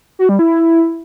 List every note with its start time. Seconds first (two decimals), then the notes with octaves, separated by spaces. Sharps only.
0.19 F#4
0.29 G3
0.39 E4